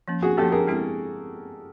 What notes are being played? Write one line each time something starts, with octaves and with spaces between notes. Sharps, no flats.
F3 A#3 C#4
F#4 G#4
F3 A#3 C#4 G4 A4
G#4 A#4
G#3 C4 E4 G#4